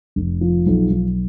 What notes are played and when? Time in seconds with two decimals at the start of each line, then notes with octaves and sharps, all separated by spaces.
0.16 F1
0.41 F3
0.66 B1
0.90 B1